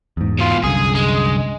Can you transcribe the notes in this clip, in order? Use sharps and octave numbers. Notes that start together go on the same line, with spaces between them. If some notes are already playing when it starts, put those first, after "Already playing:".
E2 G#2
B2 F4
C2 F#2 D3 G#4
G#3